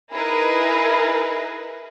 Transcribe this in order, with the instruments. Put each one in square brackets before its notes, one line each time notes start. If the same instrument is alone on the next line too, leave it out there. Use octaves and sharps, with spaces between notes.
[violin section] D#4 E4 G#4 A#4 B4